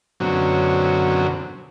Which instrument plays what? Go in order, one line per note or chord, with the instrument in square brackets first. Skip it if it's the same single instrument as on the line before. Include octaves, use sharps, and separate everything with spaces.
[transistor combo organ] F#2 B2 D3 F#3 C4 C#4